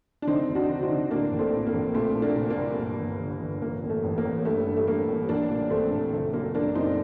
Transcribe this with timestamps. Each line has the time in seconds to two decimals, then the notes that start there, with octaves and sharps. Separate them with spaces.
0.22 D4
0.27 D3 C4 D#4
0.49 D2
0.55 D4 F#4
0.69 D3
0.83 C4 D#4
0.90 D3
1.11 A2 A#3 D4
1.32 A#1
1.39 A3 C4
1.53 A2
1.67 A#3
1.74 A#1
1.94 A#2 A3 C4
2.16 A#2
2.22 A#3 D4
2.37 A#2
2.50 A#3
2.57 C2
2.78 G2
2.99 G1
3.20 D3
3.41 G1
3.62 A1 A#3
3.83 A1
3.89 A3
4.04 A1
4.18 A#3
4.25 A1
4.45 G2 A3
4.66 G2
4.76 A3
4.87 G2 A#3
5.08 A1
5.29 A#1 A#3 D4
5.50 A#2
5.70 A#1 A3 C4
5.92 A#1
6.12 F#1 A3
6.33 F#2 A#3
6.54 F#1 A#3 D4
6.75 F#2 C4 D#4